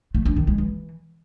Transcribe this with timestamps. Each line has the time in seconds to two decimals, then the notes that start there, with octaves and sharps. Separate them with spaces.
0.15 A3
0.25 D4
0.36 D#3
0.47 G#3
0.58 E3